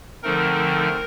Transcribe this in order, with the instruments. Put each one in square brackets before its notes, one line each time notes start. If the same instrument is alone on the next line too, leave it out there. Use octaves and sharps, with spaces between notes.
[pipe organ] D3 F3 A3 C4 D#4 A#4